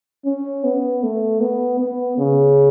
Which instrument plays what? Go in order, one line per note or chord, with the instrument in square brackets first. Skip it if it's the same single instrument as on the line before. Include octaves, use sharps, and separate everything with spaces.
[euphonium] C#4
B3
A3
B3
B3
C#3